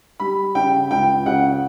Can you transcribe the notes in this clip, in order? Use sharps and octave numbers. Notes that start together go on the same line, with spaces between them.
G3 B5
C#3 G5
C#2 G5
C#3 F#5